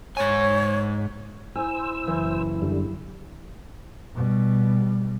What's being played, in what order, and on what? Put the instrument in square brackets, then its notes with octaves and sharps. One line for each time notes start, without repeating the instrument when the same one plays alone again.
[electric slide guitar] G#2 G#5 [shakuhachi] C#5
[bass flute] E4 [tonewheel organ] C5 E6 [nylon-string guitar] G#5
[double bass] F#1 [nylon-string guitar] E3
[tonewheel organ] F#2 D3 G3
[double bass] B2 G3